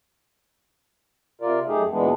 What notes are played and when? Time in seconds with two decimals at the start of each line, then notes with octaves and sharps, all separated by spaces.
1.41 C3 F4 A#4 D5
1.67 F#2 A3 D#4 G4 G#4
1.91 D2 A#2 E3 G#3 B3 D4